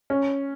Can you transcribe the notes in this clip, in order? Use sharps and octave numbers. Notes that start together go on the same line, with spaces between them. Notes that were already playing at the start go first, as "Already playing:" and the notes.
C#4